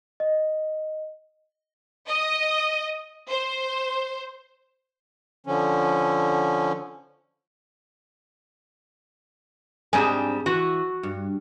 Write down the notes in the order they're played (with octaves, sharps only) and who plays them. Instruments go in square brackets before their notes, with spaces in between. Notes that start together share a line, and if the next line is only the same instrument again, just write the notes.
[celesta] D#5
[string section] D#5
C5
[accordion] D3 F3 C#4
[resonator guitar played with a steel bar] G#2 G3 G#5 [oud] C4 D4 G#4
[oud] E3 [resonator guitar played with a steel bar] F#4
[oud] G2